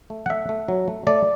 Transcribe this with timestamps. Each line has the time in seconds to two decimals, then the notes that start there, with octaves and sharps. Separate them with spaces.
0.10 A3
0.26 F#5
0.30 A3 E5
0.49 A3
0.68 F#3
0.88 A3
1.07 A3 D5